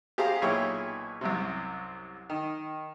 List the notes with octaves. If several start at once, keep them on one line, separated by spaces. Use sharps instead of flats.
G4 G#4 C5 F5 A#5
B1 A#2 E4 G#4 C#5 G5
C2 F#2 C3
D#3